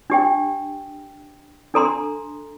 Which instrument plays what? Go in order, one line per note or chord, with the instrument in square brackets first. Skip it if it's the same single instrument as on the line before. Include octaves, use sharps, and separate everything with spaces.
[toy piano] D4 G4 G5
D4 A4 A#5 C6